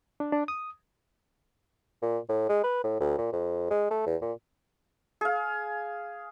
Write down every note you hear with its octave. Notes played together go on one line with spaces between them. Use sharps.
D4
D4
D#6
A#2
A2
G#3
B4
A2
D2
A#2
F2
G#3
A3
E2
A#2
G#4 F5